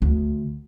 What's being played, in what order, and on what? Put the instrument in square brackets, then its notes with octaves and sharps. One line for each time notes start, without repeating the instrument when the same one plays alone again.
[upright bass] D2